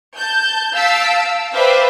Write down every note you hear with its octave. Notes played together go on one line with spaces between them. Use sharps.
A5 G6
F5 A5 E6 B6 D7
B4 C5 D5 E5 F5 G5